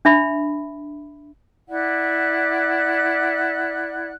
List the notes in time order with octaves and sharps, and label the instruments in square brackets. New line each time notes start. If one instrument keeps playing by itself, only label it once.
[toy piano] D4 E5 B5
[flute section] E4 D5 F#5 F#6